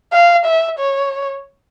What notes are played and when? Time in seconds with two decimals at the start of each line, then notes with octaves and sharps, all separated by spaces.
0.13 F5
0.45 E5
0.79 C#5